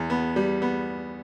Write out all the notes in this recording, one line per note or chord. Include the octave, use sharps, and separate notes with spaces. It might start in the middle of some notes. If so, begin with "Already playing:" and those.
Already playing: E2
B3
G3
B3